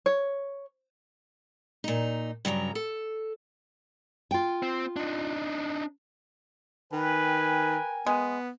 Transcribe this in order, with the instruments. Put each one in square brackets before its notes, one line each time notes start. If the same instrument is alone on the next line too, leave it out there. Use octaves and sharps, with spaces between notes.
[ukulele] C#5
[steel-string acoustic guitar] A#2 D#4
G2 C#3 F#3 A#5
A4
[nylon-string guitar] F4 G5
[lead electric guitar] C4
D4 D#4
[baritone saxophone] D#3 [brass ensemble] A#4 G5 G#5 [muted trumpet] B4
[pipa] G#3 [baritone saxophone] B3